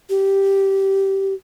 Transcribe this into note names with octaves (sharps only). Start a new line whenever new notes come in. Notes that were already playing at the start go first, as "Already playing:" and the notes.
G4